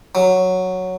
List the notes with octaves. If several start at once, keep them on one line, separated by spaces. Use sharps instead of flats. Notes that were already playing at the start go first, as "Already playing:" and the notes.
F#3